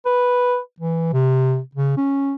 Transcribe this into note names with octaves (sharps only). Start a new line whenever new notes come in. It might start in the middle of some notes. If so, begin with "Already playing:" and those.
B4
E3
C3
C#3
C#4